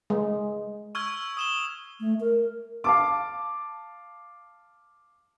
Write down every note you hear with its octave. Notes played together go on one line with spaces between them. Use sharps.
G#3
C#6 E6 F6 G#6
D#6 E7 G7
A3
A#4
F5 A5 D6